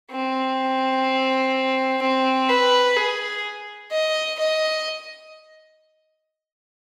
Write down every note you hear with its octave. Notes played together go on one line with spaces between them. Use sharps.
C4
C4
B4
G#4
D#5
D#5